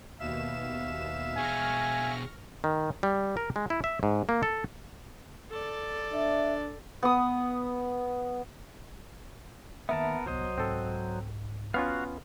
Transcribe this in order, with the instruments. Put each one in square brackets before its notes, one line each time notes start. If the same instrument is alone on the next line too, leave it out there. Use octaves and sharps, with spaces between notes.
[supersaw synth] D#2 B2 E7 [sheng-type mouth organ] E5 F5
[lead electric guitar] B2 G#4 [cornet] G#5 [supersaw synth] C#6 F6 A#6
[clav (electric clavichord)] D#3
G3
A#4
G#3
E4
E5
G#2
A#3
A4
[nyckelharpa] A4 D5
[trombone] D4 [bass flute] E5
[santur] B3 D#6
[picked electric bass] D#3 A#3 [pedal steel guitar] B3 A#4 A5 [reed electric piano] E5
[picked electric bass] D1 B3 [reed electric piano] C2 [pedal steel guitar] F#3 C5 D#5
[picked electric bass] G#2 [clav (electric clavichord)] C4 A4
[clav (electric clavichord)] B3 C#4 F4 [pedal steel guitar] F#4 F5